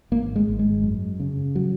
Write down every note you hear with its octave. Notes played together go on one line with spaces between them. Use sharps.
G#1 A#3
G#3
G#1
G#3
F#2
C#3
F#3